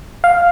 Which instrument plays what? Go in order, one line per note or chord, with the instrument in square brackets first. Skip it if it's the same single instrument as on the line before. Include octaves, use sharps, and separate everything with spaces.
[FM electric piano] F5